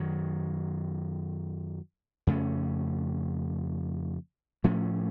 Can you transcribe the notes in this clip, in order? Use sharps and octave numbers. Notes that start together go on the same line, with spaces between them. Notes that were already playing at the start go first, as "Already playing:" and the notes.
Already playing: F#2 D#3 F#3
F2 C#3 A3 C#4
A2 F3 A3 C#4